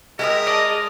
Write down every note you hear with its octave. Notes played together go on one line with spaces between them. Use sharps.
G#3 G4 A#4 E5 D#6
D5 D#5 A5